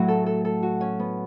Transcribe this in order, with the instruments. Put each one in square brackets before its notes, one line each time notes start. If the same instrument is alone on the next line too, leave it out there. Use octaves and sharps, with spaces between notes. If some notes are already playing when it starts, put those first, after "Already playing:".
Already playing: [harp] A2 F#3 F#4
A4
A4
A4
F#4
C#4
B3